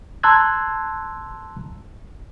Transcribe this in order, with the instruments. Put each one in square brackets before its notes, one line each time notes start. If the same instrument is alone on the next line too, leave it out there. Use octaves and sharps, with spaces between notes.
[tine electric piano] A5 A#5 C6 E6 F#6 G#6